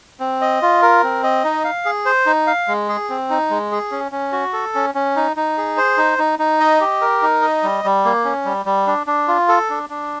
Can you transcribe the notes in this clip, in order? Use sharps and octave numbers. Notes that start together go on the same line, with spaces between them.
C4
D#5
F4
A#4
C4
D#5
D#4
F5
G#4
C5
D#4
F5
G#3
G#4
C4
D#4
G#3
G#4
C#4
C#4
F#4
A4
C#4
C#4
D#4
D#4
G#4
C5
D#4
D#4
D#4
D#5
G4
A#4
D#4
D#5
G3
G3
A#3
C#4
G3
G3
D4
D4
F4
A4
D4
D4